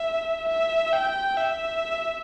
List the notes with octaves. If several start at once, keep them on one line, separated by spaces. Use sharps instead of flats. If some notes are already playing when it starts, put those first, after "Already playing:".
Already playing: E5
E5
G5
E5